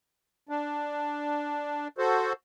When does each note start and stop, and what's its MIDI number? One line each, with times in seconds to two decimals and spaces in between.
0.49 1.88 62
1.98 2.33 66
1.98 2.33 69
1.98 2.33 72